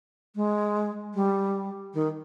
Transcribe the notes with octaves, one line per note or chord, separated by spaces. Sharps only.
G#3
G3
D#3